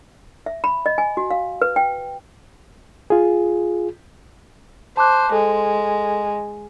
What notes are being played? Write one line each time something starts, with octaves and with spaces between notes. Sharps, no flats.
E5
B5
D#5
G#5
F#4
F5
B4
G5
F4 G#4
C5 A5 D6 F#6
G#3 A4